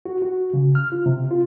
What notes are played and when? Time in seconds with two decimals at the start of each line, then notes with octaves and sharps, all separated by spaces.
0.05 F#4
0.22 F#4
0.54 C#3
0.75 F6
0.92 F4
1.06 C3
1.31 F4